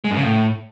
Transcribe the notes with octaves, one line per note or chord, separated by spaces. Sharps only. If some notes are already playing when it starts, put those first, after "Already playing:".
G#3
F#2
C#3
A2